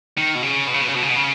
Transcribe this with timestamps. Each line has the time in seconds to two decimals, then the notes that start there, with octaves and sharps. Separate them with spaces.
0.18 D#3
0.35 B2
0.42 C#3
0.67 B2
0.74 C#3
0.82 B2
0.88 C#3
0.96 B2
1.03 C#3
1.10 B2
1.17 C#3